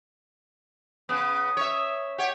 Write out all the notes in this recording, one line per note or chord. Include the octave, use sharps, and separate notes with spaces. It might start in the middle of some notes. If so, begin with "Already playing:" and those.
C#3 B3 D#6
C#5 E5
G4 C#5 F#5